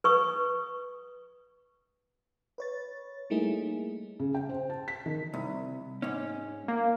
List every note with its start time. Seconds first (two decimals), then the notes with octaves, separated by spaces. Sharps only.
0.04 B4 C#6 D#6
2.58 B4 C#5 A6
3.30 G3 A3 A#3 D#4 E4 G#4
4.20 C#3
4.35 G5
4.49 C5
4.70 A5
4.88 B6
5.06 D#3
5.34 C2
6.02 G#2 C#4
6.68 A#3